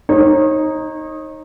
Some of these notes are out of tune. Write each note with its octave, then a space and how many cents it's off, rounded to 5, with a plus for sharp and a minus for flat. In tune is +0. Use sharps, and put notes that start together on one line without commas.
D#4 +0 C#5 -40